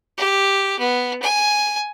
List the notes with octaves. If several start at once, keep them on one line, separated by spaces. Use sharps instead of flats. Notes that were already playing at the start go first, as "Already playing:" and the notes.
G4
B3
G#5